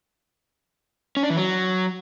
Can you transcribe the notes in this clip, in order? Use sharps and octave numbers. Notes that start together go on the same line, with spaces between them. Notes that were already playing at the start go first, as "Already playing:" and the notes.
C#4
D4
E3
F#3